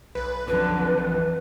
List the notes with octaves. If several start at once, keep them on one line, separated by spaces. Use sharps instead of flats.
B1 B4
F2 D3 F#3 B4
A#1 E3